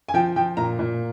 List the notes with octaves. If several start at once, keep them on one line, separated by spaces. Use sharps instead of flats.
G#5
F3 G5
F3 G5
A#2 A#5
A#2